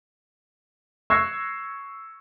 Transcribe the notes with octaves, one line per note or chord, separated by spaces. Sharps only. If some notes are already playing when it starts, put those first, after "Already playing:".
C#6 E6 F#6 G#6 A#6 C7